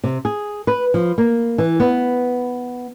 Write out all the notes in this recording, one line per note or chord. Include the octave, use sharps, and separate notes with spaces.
C3
G#4
B4
F3
A#3
E3
B3